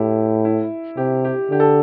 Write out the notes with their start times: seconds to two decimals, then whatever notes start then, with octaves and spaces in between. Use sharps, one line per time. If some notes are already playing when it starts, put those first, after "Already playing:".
Already playing: A2 E4 G4
0.45 E4
0.97 C3 G4
1.25 G4
1.50 D3 G4
1.60 A4